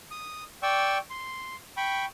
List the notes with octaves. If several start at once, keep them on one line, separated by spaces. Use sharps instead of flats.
D#6
D5 G5 C#6 E6
C6
G5 B5 C#6